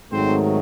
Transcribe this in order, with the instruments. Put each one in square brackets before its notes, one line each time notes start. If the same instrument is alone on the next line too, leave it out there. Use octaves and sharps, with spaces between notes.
[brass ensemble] G#1 G#2 D#3 F#3 A3 C4 C5